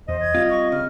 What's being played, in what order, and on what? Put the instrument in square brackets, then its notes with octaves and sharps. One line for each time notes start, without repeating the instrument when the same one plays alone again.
[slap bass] E2 [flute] C5 [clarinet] D#5
[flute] G#6
[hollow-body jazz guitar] G3 F4 [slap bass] C4
[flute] C#6
[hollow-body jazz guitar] C#3 [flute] F6